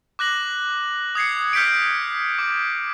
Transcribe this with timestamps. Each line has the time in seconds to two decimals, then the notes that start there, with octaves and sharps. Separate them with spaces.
0.19 D6 F#6 A#6 F#7
1.15 D#6 G#6 C7 C#7
1.53 F6 G6 B6 C#7 D7
2.39 D6